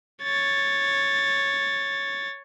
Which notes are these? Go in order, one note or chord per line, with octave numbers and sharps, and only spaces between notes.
C#5 A6